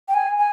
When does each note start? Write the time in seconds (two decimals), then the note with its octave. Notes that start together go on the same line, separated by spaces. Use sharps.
0.08 G5
0.14 G#5
0.37 G#5